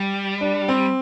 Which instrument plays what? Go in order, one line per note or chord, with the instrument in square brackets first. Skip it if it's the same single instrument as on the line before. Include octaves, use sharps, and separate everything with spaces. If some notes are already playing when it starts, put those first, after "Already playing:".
Already playing: [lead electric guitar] G3
[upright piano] D4
C4